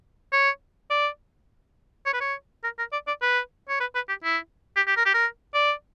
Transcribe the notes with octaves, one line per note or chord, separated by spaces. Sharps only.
C#5
D5
C#5
B4
C#5
A#4
A#4
D5
D5
B4
C#5
B4
B4
G4
E4
G4
G4
A#4
G4
A#4
D5